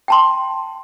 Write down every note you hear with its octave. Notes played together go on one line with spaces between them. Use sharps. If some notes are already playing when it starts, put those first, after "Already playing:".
G5 A5 C6